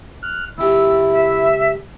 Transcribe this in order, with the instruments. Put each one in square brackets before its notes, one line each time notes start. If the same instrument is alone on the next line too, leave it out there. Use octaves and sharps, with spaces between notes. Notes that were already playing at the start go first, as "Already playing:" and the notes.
[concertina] F6 F#6
[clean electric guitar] C#2 G4 [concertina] E4 [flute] E6
[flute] E5